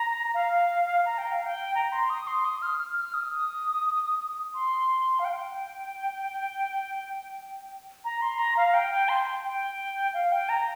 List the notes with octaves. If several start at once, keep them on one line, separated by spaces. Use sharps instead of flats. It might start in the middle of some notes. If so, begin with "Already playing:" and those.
Already playing: A#5
F5
A#5
G5
F5
G5
A#5
C6
D#6
C6
D#6
F6
F6
F6
D#6
C6
F5
G5
A#5
C6
A#5
F5
G5
G5
C6
G5
F5
G5
A#5